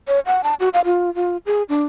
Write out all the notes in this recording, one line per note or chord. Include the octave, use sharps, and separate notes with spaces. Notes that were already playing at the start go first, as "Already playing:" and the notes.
C#5
F#5
A5
F#4
F5
F4
F4
G#4
D4